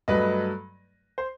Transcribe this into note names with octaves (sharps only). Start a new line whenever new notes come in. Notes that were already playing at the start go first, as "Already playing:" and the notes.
G2 F#3 A3 B4 D#5
C5